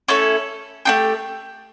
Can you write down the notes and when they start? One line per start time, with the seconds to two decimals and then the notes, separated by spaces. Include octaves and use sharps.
0.08 A3 C#4 E4 A4
0.85 A3 D4 G4